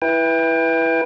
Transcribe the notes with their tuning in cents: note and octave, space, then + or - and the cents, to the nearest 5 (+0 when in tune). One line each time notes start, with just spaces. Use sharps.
E4 +0 B4 -10 G5 +30